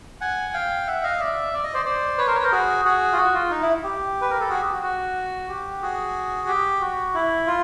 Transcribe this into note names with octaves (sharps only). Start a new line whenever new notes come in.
F#5 G#5
F5 G5
E5 F#5
D#5 F5
D5 E5
D5
D#5
C5 D5
C5 D5
B4 C#5
A#4 C5
B4 C#5
A#4 C5
F#4 G#4
F#4 G#4
F4
F#4
F4
D#4
E4
G4
B4
A#4
A4
F#4 G#4
G4
F#4
F#4
G4
F#4 G#4
G4
F#4
E4
F4